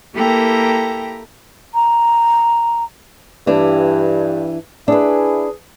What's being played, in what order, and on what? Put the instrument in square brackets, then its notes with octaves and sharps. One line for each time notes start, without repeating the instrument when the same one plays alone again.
[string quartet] A#3 E4 G4 A4 G5 A#5
[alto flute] A#5
[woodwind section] G2 [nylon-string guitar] E3 D4
[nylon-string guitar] D4 B4 [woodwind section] E4 G#4